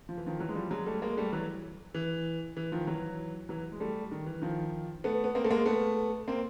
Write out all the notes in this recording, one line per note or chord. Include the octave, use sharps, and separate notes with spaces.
F3
E3
D#3 F3
E3 F#3
G#3
F3 G3
F#3 G#3
G3 A3
G#3 A#3
G3 A3
E3 F#3
E3
E3
D#3 F3
E3 F#3
E3 F#3
G#3
G3 A3
D#3
E3
D#3 F3
A3 B3
B3
A#3 C4
A3
G#3 A#3
A3 B3
A#3 C4